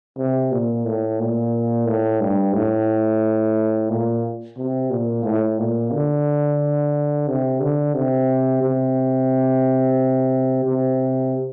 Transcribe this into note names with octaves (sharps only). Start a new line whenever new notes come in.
C3
A#2
A2
A#2
A2
G2
A2
A#2
C3
A#2
A2
A#2
D3
C3
D3
C3
C3
C3